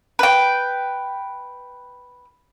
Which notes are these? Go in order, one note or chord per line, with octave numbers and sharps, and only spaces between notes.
B4 G5